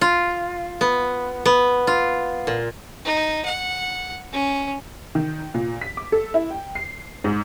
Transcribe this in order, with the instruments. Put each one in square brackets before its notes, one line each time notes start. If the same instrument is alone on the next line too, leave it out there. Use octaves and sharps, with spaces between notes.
[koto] F4
B3
B3
F4
A#2
[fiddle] D#4
F#5
C#4
[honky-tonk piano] D#3
A#2
B6
D6
A4
E4
G5
C7
G#2